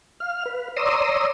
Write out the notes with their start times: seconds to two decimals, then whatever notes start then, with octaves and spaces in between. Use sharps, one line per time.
0.20 F5 F6
0.46 B4
0.77 C#5 D5 A#5 C6 D#6 E6